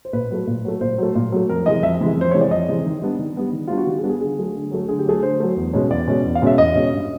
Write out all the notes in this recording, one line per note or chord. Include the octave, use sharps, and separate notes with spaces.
C5
A#2 B4
F#3 A3
A#2
F#3 A3
A#2 C5
F#3 A3
A#2
F#3 A3
F2 A#4
C3 E3 G#3 D#5
F2 E5
C3 E3 G#3
F2 C5
C3 E3 G#3 C#5
D5
F2 D#5
C3 E3 G#3
D#3
G3 B3 D4
D#3
G3 B3 D4
D#3
G3 B3 D4 F4
F#4
D#3 G4
G#4
G3 B3 D4
G#4
D3 G#4
F#3 A3
D3
F#3 A3
D3 G#4
G4
F#3 A3 G#4
D3 C5
F#3 A3
E2
B2 G#3 C#4
E2 D5
B2 G#3 C#4
E2
F5
B2 G#3 C#4 E5
E2 D#5
B2 G#3 C#4
G2